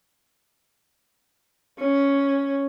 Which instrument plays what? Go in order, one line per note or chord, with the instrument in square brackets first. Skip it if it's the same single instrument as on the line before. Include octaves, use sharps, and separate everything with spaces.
[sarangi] C#4